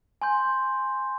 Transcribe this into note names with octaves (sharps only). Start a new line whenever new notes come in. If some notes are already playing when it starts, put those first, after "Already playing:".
G#5 C6 G6